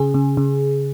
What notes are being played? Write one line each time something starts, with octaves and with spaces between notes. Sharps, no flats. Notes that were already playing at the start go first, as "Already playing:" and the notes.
Already playing: C#3 G#4
C#3
C#3